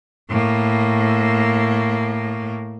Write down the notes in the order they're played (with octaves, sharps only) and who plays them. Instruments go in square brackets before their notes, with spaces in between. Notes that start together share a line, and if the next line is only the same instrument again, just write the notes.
[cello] A2 A#3